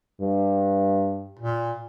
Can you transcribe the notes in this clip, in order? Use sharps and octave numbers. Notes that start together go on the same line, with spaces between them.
G2
A#2